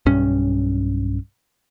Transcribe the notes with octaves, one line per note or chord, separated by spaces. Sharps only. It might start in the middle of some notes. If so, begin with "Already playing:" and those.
B1 G2 C#4